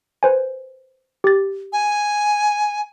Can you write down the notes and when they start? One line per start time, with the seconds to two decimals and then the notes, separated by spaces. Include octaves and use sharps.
0.23 B4 C5 G#5
1.24 G4 A6
1.73 G#5